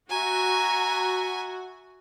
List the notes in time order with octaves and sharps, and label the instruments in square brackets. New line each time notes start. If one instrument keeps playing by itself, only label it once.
[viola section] F#4 [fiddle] E5 G#5 [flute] A#5